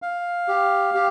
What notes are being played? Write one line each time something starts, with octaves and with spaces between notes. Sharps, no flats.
F5
G4
G4